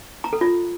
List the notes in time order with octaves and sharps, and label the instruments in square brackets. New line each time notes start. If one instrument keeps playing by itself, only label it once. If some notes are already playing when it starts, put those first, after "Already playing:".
[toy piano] A#5
A4
F4